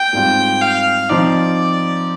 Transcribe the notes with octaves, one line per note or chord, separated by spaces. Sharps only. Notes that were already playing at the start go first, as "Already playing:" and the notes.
Already playing: G5
G#2 G3 C4 F4
F5
F3 C4 D#4 D5